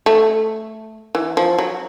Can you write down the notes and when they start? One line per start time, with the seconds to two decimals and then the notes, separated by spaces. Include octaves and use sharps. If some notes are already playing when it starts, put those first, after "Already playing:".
0.06 A3
1.15 E3
1.37 F3
1.58 F#3